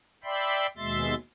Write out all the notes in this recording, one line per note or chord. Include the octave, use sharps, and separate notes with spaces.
D5 E5 G5 B5 C6
D#2 B2 G#3 E5 C6 A6